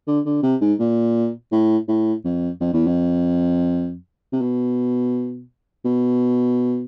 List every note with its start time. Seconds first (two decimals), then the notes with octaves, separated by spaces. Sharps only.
0.07 D3
0.26 D3
0.43 C3
0.61 G#2
0.80 A#2
1.52 A2
1.88 A2
2.24 F2
2.61 F2
2.74 E2
2.87 F2
4.32 C3
4.41 B2
5.85 B2